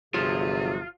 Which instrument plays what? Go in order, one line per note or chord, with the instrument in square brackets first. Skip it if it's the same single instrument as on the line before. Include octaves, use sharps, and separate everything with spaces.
[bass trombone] G1 [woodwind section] C3 G#4 [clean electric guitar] F3 F#3 [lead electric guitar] F4